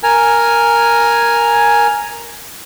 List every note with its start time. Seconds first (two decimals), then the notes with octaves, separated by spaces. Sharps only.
0.03 A#4 G#5